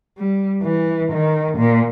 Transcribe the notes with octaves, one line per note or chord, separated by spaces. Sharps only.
G3
E3
D#3
A#2